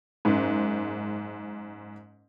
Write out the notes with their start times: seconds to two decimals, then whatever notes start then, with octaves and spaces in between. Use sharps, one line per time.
0.25 F#1 G#2